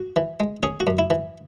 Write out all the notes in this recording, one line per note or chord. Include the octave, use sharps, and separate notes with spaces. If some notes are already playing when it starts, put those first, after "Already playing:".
Already playing: F#4
E3
G#3
C#4 G#4
F#4
F#2
E4
E3